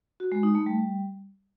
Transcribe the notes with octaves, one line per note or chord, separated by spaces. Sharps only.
F#4
G#3
D#4
A3
G3